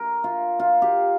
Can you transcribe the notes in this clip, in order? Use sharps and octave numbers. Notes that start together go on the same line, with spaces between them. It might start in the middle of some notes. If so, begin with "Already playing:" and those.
Already playing: A#4
F4
F4
G4